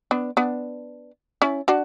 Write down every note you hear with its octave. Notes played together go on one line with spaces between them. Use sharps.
B3 D4
B3 D4
C#4 E4
D4 F#4